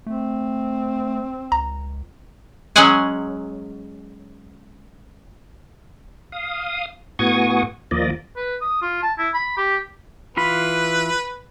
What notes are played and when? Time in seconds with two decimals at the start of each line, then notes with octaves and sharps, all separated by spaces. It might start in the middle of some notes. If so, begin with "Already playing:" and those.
0.06 A3 C4
1.52 C#2 A#5
2.76 F#3 G#3 C#4 G#4 F#5 G#5
6.32 F5 D#6
7.19 A2 B3 F#4 G#5 C#6 D#6
7.91 D#2 F3 A#3 D5 D#5
8.37 B4
8.61 D#6
8.82 F4
9.03 A5
9.18 E4
9.34 B5
9.57 G4
10.37 E3 F4 B4 B5